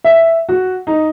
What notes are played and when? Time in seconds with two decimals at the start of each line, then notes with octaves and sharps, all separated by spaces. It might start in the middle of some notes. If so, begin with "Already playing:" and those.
0.04 E5
0.49 F#4
0.87 D#4